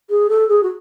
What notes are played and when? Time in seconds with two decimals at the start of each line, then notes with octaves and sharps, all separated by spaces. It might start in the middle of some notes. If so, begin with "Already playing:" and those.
0.09 G#4
0.29 A4
0.49 G#4
0.63 F#4